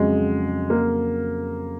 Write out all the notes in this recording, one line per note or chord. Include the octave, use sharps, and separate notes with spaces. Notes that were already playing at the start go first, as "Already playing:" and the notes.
Already playing: F2 C#3 F#3 G#3
A#3